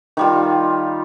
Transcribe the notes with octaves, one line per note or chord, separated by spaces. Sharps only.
D#3 G3 F4